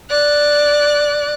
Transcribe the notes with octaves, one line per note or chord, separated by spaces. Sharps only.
D5 F#6